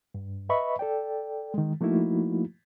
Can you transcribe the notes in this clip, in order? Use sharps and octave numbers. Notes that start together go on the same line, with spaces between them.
G2
B4 D#5 E5 B5 C#6
A4 D5 G5
D#3 G#3
F3 A3 A#3 D#4 E4 F#4